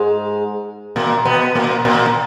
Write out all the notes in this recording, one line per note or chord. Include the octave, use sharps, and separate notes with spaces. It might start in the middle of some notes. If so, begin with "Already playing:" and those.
Already playing: G#2 G#3
A#2 A#3
B2 B3
A#2 A#3
A#2 A#3